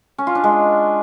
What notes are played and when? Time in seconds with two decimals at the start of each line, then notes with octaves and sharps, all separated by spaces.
0.18 C#4
0.27 F4
0.35 D4
0.44 G#3